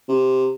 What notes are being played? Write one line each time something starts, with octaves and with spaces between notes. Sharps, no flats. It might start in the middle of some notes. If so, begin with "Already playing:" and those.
C3